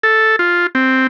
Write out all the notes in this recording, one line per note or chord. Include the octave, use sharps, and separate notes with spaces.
A4
F4
C4